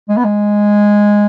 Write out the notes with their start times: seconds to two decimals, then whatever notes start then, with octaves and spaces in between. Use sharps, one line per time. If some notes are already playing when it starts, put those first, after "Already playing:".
0.09 G#3
0.17 B3
0.24 G#3